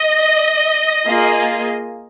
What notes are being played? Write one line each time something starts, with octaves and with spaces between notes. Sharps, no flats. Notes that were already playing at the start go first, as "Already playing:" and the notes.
Already playing: D#5
A#3 F4 G#4